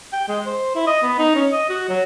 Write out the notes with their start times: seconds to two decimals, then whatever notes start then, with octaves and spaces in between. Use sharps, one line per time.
0.13 G5
0.28 G#3
0.46 C5
0.75 E4
0.87 D#5
1.02 B3
1.19 D#4
1.35 C#4
1.53 D#5
1.69 F#4
1.89 F#3